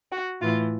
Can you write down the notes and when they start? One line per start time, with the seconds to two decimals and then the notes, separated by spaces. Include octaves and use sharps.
0.12 F#4
0.41 A2 E3 F4